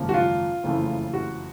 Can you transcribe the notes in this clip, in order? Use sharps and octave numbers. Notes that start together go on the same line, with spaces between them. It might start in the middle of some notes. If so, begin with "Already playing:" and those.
Already playing: G#1 F#2 C#3 F3 A#3
F#4
F4
F#1 F2 C#3 E3 A3
F#4